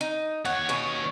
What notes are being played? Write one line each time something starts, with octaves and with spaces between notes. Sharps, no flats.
D#4
D#2 C#5 F#5
B2 C#4